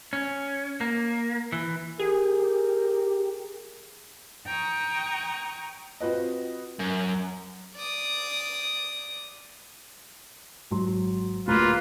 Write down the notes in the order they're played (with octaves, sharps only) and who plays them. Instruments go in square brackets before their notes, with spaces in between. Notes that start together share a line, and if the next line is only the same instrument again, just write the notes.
[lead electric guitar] C#4
A#3
E3
[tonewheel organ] G4 [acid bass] G#4 [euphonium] A#4
[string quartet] G5 A#5 C#6 D#6
[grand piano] C4 F4 F#4 B4 D#5
[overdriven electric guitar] F#2
[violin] D5 D#6
[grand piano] G#1 F#3 C6
[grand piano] D1 A#5 [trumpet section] A#3 F4 B4